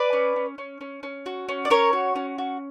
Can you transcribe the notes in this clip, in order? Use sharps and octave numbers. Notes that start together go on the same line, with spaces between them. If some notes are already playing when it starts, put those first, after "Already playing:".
Already playing: B4 D5
C#4
C#4
C#4
C#4
C#4
F#4
C#4
D5
C#4 A#4 C#5
F#4
C#4
F#4